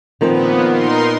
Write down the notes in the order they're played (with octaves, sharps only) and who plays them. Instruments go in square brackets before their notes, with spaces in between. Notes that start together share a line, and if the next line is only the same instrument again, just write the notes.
[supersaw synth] A#2 B3 [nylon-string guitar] D#3 F3 C4
[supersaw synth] D#4 A#4 C6